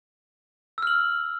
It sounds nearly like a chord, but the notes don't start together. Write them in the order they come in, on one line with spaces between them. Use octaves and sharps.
E6 F6 F#7